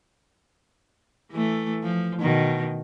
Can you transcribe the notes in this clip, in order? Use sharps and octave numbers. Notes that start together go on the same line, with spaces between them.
E3 A3
F3
B2 D#3